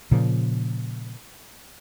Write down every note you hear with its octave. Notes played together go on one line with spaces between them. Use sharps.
A#2 C#3 F3